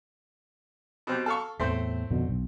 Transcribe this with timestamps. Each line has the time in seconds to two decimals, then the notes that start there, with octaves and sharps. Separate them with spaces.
1.07 B2 C4 G4
1.26 A4 F5 C#6
1.59 E2 A2 A3 C4 C5
2.10 F2 B2 D3
2.29 B1